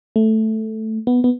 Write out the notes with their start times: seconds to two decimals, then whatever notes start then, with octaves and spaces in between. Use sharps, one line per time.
0.16 A3
1.07 B3
1.24 B3